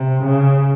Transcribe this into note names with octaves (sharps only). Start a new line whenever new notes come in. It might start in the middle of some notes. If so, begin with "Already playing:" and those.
Already playing: C3
C#3